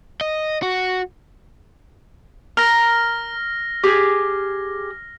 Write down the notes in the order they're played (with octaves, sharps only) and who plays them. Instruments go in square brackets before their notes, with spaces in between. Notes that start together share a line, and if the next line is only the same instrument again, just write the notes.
[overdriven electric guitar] D#5
F#4
[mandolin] A#4 [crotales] F6 A#6
[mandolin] G4 G#4